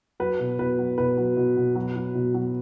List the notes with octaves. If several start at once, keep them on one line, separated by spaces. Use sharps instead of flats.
F#3 B4
B2
B2 B4
F#3
B2 B4
F#3
B2
B2
F#3
F#3
B2
F#3